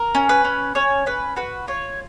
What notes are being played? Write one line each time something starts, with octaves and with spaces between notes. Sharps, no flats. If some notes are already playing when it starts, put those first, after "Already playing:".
Already playing: A#4
C#4
B4
C#4
C#4 C#5
C#4 B4
F#4 B4
F4 C#5